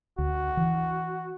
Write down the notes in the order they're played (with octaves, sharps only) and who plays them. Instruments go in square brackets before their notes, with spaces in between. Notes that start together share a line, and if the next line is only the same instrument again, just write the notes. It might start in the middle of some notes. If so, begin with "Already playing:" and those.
[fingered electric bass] D2 [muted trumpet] F#4
[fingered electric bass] E3